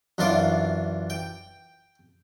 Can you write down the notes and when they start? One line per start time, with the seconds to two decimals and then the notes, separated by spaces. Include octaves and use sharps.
0.18 F#2 E3 D4 F4 C6 D6
1.10 G5